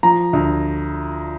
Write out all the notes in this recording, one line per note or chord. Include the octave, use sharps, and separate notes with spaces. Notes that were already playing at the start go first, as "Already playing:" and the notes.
F3 A#5
D2